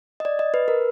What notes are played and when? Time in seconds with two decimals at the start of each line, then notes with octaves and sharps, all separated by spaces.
0.20 D#5
0.25 D5
0.39 D#5
0.54 B4
0.68 A#4